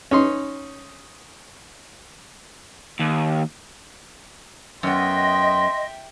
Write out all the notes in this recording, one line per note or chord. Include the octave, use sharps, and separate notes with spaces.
C#4 D#4 C6
D#2
F#2 B3 D#5 E5 G5 C6